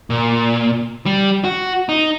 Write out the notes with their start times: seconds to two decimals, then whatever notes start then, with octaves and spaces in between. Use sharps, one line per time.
0.10 A#2
1.06 G3
1.44 F#4
1.89 D#4